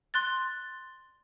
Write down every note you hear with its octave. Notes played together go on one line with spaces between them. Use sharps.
C6 F#6 A6